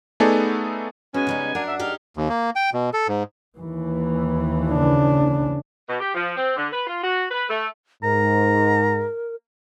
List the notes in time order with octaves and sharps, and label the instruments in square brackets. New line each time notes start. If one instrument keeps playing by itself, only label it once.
[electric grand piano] A3 B3 D#4 G#4 A4 D5
[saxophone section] G#3 B3 C#4 [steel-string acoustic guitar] F#4 [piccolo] G#5
[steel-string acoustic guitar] C#3 G3 D#4
[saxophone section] F#2 D4 F#5 [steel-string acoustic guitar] A#4
[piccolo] E5
[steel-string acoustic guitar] D#4 G4 G#4 [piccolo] F6
[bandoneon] D#2
A#3
G5
B2
A4
G#2
[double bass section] D#2 E3
[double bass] C#3 D4
[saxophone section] B2
G4
F3
C4
D3
B4
F4
F#4
B4
A3
[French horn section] G#2 [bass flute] A#4 [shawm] A#5